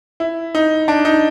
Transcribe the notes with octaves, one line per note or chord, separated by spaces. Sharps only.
E4
D#4
D4
D#4